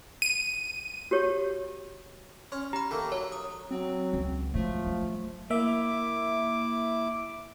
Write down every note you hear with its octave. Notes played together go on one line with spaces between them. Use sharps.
D#7
F#4 G4 C#5
C#4 C6 F6
G4 A#5 B5
D#3 A3 A#3
F#3 C#5
D#6
F#3 C4
C#2
F3 F#3 G#3 A3
F#3
A#3 E4 E5 D6